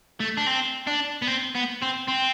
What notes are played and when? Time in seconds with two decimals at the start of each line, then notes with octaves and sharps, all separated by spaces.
0.20 A3
0.37 D4
0.47 C4
0.87 D4
1.22 B3
1.27 C4
1.55 B3
1.82 C4
2.08 C4